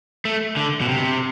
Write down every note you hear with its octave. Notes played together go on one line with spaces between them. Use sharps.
A3
D3
B2
C3